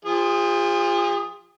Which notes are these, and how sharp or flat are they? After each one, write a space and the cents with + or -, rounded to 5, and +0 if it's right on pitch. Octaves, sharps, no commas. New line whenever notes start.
F3 +0 G#4 -40 D#6 +0